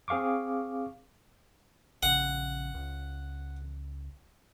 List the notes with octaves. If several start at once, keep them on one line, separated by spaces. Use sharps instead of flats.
C4 G#4 F5 C#6 D6
A#1 C#3 F#5
C#2